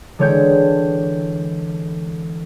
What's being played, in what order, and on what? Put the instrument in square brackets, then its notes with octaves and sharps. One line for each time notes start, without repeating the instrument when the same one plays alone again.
[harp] D3 E3 G#3 C#5 G5 G6